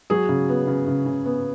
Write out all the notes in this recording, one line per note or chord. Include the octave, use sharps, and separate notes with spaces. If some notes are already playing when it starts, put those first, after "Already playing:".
F#3 G#4
C#3
B3
C#3
C#3
C#3
B3